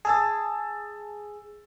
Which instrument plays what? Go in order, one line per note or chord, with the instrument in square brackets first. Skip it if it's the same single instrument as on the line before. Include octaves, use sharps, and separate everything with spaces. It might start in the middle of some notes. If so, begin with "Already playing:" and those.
[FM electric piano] G#4 [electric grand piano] A5 E6 A6